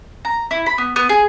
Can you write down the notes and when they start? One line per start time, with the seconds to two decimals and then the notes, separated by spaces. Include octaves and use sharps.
0.25 A#5
0.51 E4
0.66 B5
0.78 B3
0.96 B3
1.09 G#4